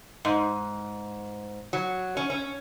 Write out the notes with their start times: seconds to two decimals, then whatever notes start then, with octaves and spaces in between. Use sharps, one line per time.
0.25 G#2
1.73 F#3
2.17 C#4
2.30 C#4